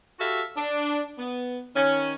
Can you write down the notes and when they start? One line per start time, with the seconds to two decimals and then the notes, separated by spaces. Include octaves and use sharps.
0.19 F#4 G4 A4 E5 F5
0.57 D4
1.18 B3
1.76 D#3 C#4